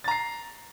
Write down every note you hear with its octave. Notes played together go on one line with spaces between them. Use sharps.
A#5 A6 C7